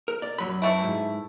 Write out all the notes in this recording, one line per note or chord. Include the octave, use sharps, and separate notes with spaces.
A#4
D5
F#2 F#3 B5
E3 A3 E4
G#2